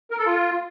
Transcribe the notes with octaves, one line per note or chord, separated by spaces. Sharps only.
A#4
A4
F4